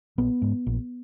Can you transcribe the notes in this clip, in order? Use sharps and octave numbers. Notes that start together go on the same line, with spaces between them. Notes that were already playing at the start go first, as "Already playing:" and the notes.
A#1 B3
G#2
A#1